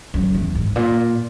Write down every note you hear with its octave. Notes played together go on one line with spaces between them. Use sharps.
F#2
E2
G#2
A#2